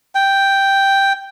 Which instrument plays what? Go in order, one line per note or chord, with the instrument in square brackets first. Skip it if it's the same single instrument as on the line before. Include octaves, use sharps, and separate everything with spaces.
[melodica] G5